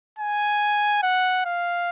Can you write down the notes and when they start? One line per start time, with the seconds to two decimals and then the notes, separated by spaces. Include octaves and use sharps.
0.19 G#5
1.03 F#5
1.46 F5